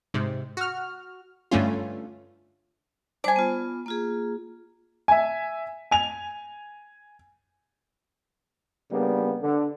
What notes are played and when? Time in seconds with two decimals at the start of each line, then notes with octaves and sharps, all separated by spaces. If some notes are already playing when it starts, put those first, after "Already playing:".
0.14 G#2 C3
0.57 F#4 F6
1.51 G2 D3 A3 C#4 F4
3.24 G3 C5 D5 G#5 A5
3.36 B3 F4
3.86 A#3 F4 G#4
5.08 E5 G#5
5.91 G#5 F7
8.91 C#3 G3 A#3 B3 D4
9.41 D3